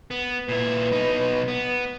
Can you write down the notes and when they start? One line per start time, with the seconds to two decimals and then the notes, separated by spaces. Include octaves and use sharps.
0.11 B3
0.49 A#2 E4 B4
0.93 B2 D#4
1.48 B3